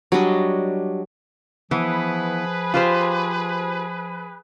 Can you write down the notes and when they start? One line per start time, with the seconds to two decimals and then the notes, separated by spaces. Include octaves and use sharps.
0.12 F#3 G3 D4 D#5
1.71 E3 F3 B3 G#4 B4
2.74 F4 G4 C5